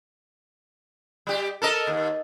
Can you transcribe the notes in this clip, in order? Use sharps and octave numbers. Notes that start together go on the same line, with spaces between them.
G3 G4
A4 A#4 D#5
D#2